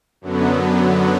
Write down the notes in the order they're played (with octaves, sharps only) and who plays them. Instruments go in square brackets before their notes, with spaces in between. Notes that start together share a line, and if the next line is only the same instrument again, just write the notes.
[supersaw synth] F#2 D3 F#3 B3